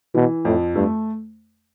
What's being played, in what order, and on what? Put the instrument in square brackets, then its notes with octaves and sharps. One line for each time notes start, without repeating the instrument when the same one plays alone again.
[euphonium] B2 [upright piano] E3
[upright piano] F2 [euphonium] A2
[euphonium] G2 [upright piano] A3